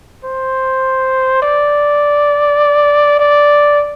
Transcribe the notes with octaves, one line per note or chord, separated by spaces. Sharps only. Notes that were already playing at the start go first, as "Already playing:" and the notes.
C5
D5
D5